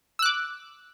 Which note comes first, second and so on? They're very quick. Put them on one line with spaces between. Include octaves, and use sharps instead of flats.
E6 F#6 D6